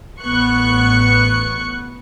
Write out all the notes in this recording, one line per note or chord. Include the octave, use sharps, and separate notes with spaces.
A1 B3 C#6 F#6 C#7